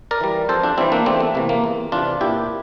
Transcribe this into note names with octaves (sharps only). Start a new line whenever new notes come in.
A#4 D5
E3 G3
F2 A4 C5
D4 F4
E3 G3 C4 E4
A#3 D4
E2 A3 C4
A3
C3 E3 A#3
A#3
E2
C3 E3 D4 F4
A#2 E4 G4